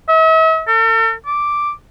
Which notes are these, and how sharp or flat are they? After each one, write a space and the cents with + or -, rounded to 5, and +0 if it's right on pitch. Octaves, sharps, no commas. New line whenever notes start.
E5 -45
A4 +45
D6 +0